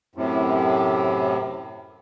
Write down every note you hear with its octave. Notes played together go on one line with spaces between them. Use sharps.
F#2 A2 C3